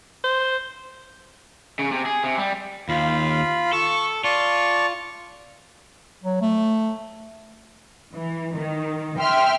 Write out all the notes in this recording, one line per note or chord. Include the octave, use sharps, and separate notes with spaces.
C5
C#3
C3
G#4
C3
G3
D#2 F4 F5 B5
A4 C#6
F4 D5 A5 C#6
F#3
A3
E3
D#3
E5 G5 C6 F6